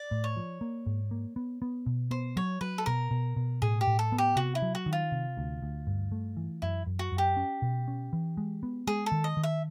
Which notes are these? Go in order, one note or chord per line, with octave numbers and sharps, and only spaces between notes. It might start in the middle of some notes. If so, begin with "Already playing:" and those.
Already playing: D5
A2
C#5
F3
A#3
G#2
A#3
B3
B3
B2
B3 C5
F#3 C#5
F#3 B4
A4
B2 A#4
B2
B2
A2 G#4
G4
A2
A4
B3
G4
C3 F#4
E4
F#3
F#4
D#3
F4
C3
D2
D2
G2
A3
E3
F#2 E4
F#2
F#4
F#2
G4
C#4
B2
C#4
E3
G#3
B3
G#3 G#4
A4
D#3
D#5
D#3
E5